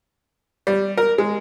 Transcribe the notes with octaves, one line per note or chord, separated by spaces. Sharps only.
G3
A#4
G#3